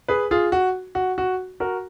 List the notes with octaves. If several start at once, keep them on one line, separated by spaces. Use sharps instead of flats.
G#4 B4
F4 G#4
F#4
F#4
F#4
F#4 A#4